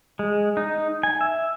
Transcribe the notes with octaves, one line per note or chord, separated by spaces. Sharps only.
G#3
D#4
G#5
E5